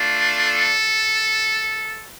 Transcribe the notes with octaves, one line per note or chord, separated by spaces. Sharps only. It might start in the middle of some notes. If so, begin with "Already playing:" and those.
Already playing: A3 D4 F4
A4